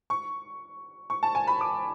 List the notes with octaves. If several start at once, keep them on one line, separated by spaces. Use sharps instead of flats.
C#6
C#6
A5
G#5
B5
D6